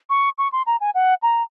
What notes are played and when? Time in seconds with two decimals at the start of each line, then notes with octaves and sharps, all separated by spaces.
0.10 C#6
0.38 C#6
0.52 C6
0.67 A#5
0.81 G#5
0.95 F#5
1.23 A#5